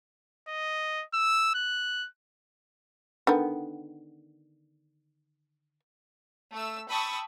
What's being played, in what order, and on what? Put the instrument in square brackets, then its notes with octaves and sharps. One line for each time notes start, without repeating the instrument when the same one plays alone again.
[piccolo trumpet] D#5
E6
F#6
[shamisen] D3 D#3 B3
[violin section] A3 E6
G5 A5 B5 C#6 D#6 E6